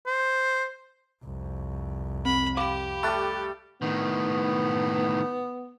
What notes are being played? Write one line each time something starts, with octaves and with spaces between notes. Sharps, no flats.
C5
C2 F2
C4 B5
G4 F5 B5 D6
G3 A3 B5 F#6 A6
A2 D#3 B3